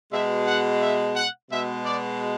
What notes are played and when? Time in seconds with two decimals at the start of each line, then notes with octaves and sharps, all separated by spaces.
0.12 B2 G#3 E5
0.47 F#5
0.82 E5
1.16 F#5
1.51 B2 G#3 E5
1.85 D5